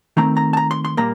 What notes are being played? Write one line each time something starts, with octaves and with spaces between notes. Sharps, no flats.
D#3 A3 C4 A#5
A#5
A5
A#5
C6
C6
A#2 G3 A#3 A#5